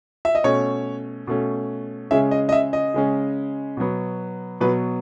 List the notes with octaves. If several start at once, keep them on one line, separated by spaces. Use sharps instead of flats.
E5
D#5
B2 A3 C#4 C#5
B2 A3 C#4
C#3 G#3 C#4 E5
D#5
D#5
E5
D#5
C#3 G#3 C#4
B2 F#3 B3
B2 F#3 B3 B4